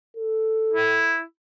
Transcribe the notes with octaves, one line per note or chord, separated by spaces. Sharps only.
A4
E4